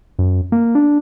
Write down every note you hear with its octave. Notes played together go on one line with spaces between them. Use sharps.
F#2
A#3
D4